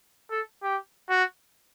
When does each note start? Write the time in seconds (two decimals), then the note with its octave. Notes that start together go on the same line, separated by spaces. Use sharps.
0.31 A4
0.63 G4
1.09 F#4